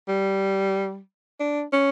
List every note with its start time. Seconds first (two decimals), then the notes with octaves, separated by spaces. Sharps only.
0.08 G3
1.40 D4
1.73 C#4